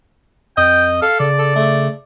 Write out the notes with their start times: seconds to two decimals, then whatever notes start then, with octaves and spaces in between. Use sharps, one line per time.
0.57 F2 D#5 G5
1.02 A4 F5
1.20 C#3 D5
1.39 A4
1.56 A3